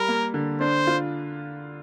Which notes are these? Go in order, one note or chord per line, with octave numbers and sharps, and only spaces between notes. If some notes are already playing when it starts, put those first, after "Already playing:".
Already playing: G3 A#4
A#3
D3
D4 C5
F4